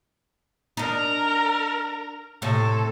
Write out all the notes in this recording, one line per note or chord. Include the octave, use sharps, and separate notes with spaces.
D4 D#4 A#4
A2 C3 A4